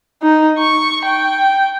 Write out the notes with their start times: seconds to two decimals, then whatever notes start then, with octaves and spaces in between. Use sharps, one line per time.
0.22 D#4
0.58 C#6
1.05 G5